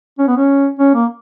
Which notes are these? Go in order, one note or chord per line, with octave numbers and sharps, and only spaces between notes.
C#4
B3
C#4
C#4
A#3